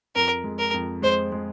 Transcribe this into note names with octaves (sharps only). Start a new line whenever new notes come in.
F2 A#4
G#3
A#4
F2
G#3 C5
G#3